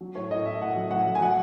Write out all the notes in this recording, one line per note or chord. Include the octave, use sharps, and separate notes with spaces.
F#3
A2 C#5
A2 D#5
A2 E5
A2 F#5
F#3
A2 F#5
F#3
G#5
F#3 F#5